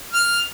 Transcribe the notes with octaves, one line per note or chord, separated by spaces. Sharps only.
F6